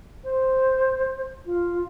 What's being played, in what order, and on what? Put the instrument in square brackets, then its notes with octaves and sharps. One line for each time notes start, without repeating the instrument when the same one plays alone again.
[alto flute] C5
F4